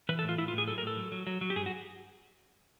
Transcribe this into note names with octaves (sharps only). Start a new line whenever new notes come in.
E3 B4
A4
A2
F4
A2 E4
F4
A2
G#4
F#3 A4
A#4
A2 A4
F#3
F#3
F#3
F#3
G4
G2 G#4
F#4